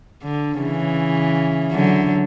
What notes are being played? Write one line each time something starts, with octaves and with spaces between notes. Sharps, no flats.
D3
C#3 E3
D3 F#3